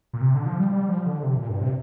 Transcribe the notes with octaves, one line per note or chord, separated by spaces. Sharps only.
A#2
C3
D3
F3
G3
G3
F3
D3
C3
A#2
G2
C3